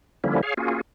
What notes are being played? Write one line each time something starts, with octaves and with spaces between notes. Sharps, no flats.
D3 F3 G3 A#3 C#4 E4
G#4 C#5 F5
A#3 C#4 F4 F#4 G#4